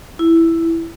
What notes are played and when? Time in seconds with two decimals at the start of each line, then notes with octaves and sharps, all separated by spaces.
0.19 E4